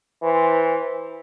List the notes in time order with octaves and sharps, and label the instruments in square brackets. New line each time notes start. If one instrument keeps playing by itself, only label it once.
[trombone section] E3 C5